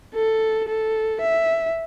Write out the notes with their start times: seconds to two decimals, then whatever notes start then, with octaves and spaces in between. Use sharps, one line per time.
0.14 A4
0.68 A4
1.21 E5